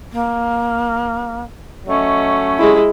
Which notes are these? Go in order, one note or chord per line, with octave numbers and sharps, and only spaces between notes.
A#3
F#3 A3 C#4 D#5
G#3 E4 G4